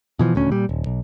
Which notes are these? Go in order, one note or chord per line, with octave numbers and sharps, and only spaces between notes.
B2 E3 F3
D#1 D2 C#4
A#2 G3
D#1
B1